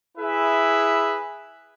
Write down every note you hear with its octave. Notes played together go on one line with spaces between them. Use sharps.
E4 G#4 B4 E5